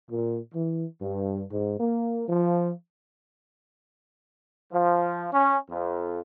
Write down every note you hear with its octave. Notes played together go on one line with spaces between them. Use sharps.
A#2
E3
G2
G#2
A#3
F3
F3
C#4
F2